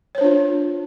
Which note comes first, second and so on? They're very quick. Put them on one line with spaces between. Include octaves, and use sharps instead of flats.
C#5 C5 D4 F4